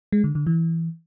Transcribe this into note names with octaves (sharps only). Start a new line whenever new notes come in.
G#3
D3
D3
E3